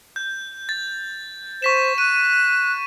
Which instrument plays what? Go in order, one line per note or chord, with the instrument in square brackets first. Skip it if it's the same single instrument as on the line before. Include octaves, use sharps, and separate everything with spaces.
[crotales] G6
A6
[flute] C5 [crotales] C#6 B6 E7
[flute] F#6 [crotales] D#7